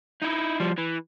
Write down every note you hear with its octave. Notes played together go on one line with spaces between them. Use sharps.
D#4 E4
F3 G3
E3